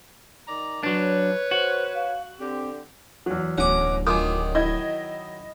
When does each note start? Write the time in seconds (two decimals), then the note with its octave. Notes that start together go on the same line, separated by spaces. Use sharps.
0.48 D#3 D5 A#5
0.83 F#3 D4 B4 C#5
1.51 F#4 C5
1.95 F5
2.39 D3 C4 G4
3.26 E2 F#3
3.58 D1 B2 C#4 F#5 D6
4.07 D#3 F#3 F4 G#5 D6 D#6
4.55 E4 D#5 G#6